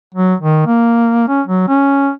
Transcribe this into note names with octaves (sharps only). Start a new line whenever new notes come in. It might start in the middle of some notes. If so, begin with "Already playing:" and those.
F#3
D#3
A#3
C#4
F#3
C#4